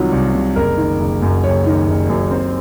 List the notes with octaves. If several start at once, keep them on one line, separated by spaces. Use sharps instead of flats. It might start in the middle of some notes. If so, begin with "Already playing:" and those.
Already playing: C2 C3 D#3 F#3 F4 F#4
C2
C3
F#1 A#4
D#3
F#1
F#2
F#1 C#5
D#3
F#1
F#2
C4